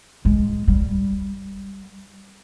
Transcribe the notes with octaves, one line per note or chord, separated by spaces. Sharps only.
G#3
G3